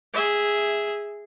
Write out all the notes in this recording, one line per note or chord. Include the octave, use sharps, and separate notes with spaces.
G#4 E5